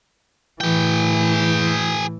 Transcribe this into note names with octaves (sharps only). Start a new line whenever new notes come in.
A2 E3 G#4 G5